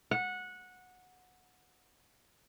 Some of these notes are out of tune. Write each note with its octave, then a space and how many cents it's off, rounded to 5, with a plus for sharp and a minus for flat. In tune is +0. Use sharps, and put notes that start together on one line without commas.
F#5 -15